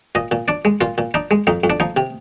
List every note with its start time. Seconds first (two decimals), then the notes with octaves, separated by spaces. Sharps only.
0.15 A#2 D#5
0.31 A#2
0.48 D4 D5
0.65 G#3
0.81 A#2 F4
0.98 A#2
1.14 D4 D#4
1.31 G#3
1.47 F2 D#4
1.64 F2
1.70 D4
1.80 F3 D#4
1.96 C3